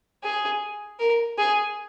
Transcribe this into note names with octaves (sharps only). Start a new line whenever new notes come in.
G#4
A#4
G#4